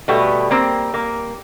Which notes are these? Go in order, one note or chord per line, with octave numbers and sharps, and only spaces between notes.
B2 G3 A3 B3
A#3 C4
A#3